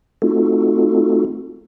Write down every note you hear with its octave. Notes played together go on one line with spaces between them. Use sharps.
A3 C4 D#4 F4 F#4 A4